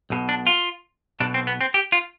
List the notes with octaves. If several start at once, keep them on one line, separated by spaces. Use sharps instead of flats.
B1 B2
D4
F4
B1 B2 D4
C4
B3
C4
G4
F4